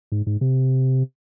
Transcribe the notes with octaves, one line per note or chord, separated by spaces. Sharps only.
G#2
G#2
C3